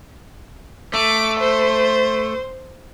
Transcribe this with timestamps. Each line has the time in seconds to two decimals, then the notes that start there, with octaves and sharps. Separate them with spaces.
0.94 A3 D6
1.40 C5